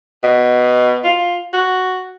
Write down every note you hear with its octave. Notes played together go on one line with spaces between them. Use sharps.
B2
F4
F#4